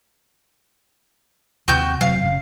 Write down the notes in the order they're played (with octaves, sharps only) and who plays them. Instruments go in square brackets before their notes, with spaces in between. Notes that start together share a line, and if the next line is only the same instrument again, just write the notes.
[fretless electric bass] D#2 C3 [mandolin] F#4 G5 G6
[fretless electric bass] F1 C3 F#3 [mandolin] F5
[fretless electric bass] F#1 C#3